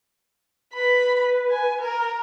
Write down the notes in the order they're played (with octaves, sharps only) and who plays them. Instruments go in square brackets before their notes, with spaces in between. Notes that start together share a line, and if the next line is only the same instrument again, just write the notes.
[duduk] B4 [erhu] B5
[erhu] G#5
A#4